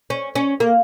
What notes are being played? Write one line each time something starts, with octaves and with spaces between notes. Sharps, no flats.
C#4
C#4
A#3